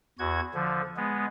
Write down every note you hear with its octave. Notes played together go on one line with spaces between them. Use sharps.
E2 F#4 G#6
D3 F3
G#3 B3